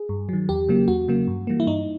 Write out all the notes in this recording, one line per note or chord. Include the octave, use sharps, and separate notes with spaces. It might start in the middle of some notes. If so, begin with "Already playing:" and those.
Already playing: G#4
G2
D#3 F#3
E2 G4
C#3 F#3 A#3
E2 F#4
C#3 F#3 A#3
G2
E3 G3 A#3
E4
G2 D#4